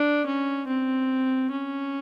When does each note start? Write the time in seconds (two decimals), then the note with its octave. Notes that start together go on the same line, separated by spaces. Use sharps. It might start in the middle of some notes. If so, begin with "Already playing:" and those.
Already playing: D4
0.26 C#4
0.67 C4
1.51 C#4